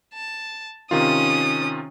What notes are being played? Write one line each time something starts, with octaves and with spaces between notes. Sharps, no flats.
A5
C3 D#3 C#4 F4 D#6